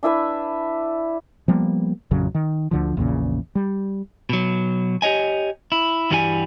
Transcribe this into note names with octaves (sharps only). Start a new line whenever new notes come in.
D4 E4 B4 E5
F3 G3 A#3 B3
A1 F2 C#3 F#3
D#3
D2 D3 F3
A#1 E2 A#2 C#3
G3
B2 F#3
G4 C#5 D#5 G#5
E4
G2 E3 G3 E4 F#4 G#5